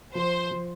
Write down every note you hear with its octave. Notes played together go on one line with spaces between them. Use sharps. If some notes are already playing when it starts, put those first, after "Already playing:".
F3 C5
F3